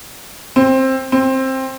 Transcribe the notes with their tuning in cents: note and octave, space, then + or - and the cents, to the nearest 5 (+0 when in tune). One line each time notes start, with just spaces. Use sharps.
C4 +15
C4 +15